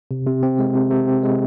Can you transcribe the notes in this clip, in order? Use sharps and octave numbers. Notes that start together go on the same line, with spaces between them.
C3
C3
C4
G#3
C3
C3
C4
G#3